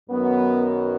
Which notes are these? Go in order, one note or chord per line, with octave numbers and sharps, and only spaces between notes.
F#2 D#3 F#3 B3